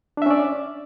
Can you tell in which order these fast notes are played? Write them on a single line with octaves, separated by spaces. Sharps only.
D4 E5 C#4 D5